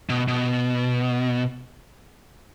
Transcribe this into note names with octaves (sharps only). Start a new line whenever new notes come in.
B2
B2